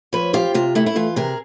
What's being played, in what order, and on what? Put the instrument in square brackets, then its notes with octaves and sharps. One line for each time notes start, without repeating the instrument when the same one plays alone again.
[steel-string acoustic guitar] F3 B4 C#5
C4 F4 G4
C3 F4
A3 E4
E4
E3 F4
C3 G#4 A#4